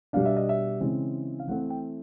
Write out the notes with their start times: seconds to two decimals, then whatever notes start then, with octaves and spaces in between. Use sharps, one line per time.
0.13 B2 G3 B3 D4 F5
0.25 E5
0.37 D#5
0.49 E5
0.81 C#3 E3 G#3 C4
1.39 F5
1.47 E3 A3 C4 F#5
1.70 G5